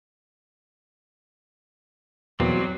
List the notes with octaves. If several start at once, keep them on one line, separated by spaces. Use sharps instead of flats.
E2 B2 F#3 G3 A#3 C4